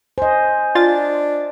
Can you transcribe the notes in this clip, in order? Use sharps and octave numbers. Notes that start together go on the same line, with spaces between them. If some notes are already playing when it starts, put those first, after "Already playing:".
C5 D#5 G#5
D4 F4 A6